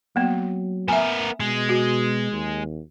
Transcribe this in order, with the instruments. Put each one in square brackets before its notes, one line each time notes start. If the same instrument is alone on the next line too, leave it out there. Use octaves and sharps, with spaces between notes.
[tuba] F#3 [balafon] A#3 B3
[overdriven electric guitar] B3 A#4 [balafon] E5 G#5
[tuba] B2 [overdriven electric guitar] G#3
[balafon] F#4
[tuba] D#2